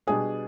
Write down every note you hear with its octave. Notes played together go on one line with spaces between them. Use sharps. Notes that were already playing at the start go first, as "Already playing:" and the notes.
B2 G3 D4 G#4